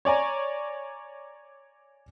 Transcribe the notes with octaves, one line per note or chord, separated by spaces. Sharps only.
C#5 D5 G#5 A#5